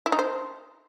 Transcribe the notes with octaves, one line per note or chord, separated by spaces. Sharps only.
E4
D#4
C5